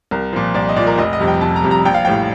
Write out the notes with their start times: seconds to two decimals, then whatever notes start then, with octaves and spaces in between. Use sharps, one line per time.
0.11 C2 A#4
0.33 A#2 F3
0.55 C2 D5
0.69 D#5
0.76 A#2 D5
0.80 F3
0.87 A#4
0.98 F1 D#5
1.13 D#5
1.19 F2 C3 G3
1.27 G5
1.41 F1 A5
1.56 A#5
1.64 F2 C3 G3
1.71 A#5
1.85 A#1 G5
1.94 F5
2.05 A2 G3 G5